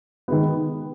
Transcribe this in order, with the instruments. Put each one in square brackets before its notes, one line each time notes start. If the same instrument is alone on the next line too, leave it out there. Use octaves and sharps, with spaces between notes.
[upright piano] D#3 G#3 B3